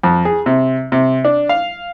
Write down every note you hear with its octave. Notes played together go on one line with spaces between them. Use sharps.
F2
G#4
C3
C3
D4
F5